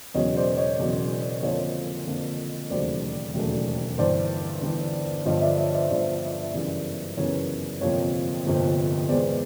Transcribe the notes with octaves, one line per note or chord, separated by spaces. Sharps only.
E1 E2 C#3 F#3 C#5 D#5
C5 D5
C#5 D#5
E1 E2 C#3 F#3
F2 D3 F3 A#3 C#5 D#5
F2 D3 F3 A#3
E1 D#2 C#3 F#3 A3 C5 D5
E1 D#2 C#3 F#3 A3
G1 G2 E3 C5 D5
G1 G2 E3
G1 G2 D3 F3 C#5 D#5
D5 E5
C#5 D#5
C5 D5
G1 G2 D3 F3 C5 D5
F#2 C#3 E3 G3 B3
F#2 C#3 E3 G3 B3 C#5
G1 F2 C3 F3 A#3 C#5
G1 F2 C3 F3 A#3
E2 B2 G#3 B3 C5 D5